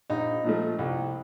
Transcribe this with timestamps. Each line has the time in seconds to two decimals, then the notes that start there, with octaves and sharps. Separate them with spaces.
0.10 A#1 D#4
0.44 A#2 F3 A3
0.79 C2